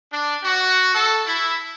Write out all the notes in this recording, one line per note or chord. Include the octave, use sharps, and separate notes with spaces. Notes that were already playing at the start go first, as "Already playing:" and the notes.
D4
F#4
A4
E4